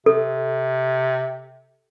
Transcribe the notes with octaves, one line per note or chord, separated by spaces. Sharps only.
C3 A4